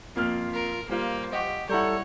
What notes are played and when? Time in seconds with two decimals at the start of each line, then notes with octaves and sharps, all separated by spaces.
0.16 F2 A#3 F4 F6
0.54 A#4
0.89 G3 A#3 F4 C5
1.33 G4 D#5 F#5 C#6
1.69 G3 E4 A4 C#5 F#5 A#5 G6